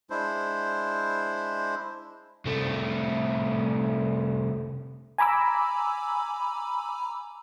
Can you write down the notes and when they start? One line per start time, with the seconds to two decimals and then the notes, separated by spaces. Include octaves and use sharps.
0.10 G#3 D4 E4 C5
2.45 C2 A3
5.18 G#5 A#5 B5 D6 E6